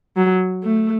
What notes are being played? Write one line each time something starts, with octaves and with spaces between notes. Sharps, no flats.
F#3
A3